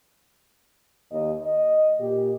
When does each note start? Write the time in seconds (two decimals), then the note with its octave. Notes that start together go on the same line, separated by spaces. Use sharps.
1.12 D#2 D#5
1.44 D#5
2.00 A#2 G4